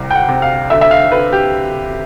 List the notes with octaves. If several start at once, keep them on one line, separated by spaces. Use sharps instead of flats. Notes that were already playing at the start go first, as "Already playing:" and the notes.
Already playing: C2 C3
G5
F#5
C3
F5
D3 E5
E5
F5
D3 B4
G4